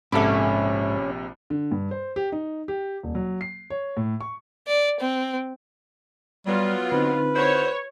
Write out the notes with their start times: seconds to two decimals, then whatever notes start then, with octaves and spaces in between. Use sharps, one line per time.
0.12 A#1 G#2 C3 C#4 A4 E5 B5 D6
1.50 D3
1.71 G2
1.91 C5
2.16 G4
2.32 D#4
2.68 G4
3.03 D#1
3.15 F#3
3.41 C7
3.70 C#5
3.97 A2
4.21 C#6
4.68 D5
5.00 C4
6.47 F#3 G3 B3 F4
6.92 D3 C4 D#4 B4
7.36 E4 F#4 C5 C#5